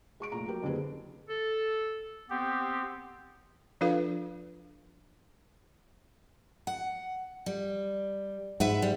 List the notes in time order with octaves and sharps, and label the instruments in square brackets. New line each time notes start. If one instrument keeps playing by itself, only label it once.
[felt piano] G#3 C#6 D7
F1 A#2 A#5
F#3 G4 A#4
F#1 D3 C4 G#4 B4
[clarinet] A4
[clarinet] B3 [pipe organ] C4 G4
[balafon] F3 D4 F4 A4 B4 F5
[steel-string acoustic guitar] F#5
G3
[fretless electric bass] G#2 [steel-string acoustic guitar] B4 E5 F#5
[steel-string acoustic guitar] G3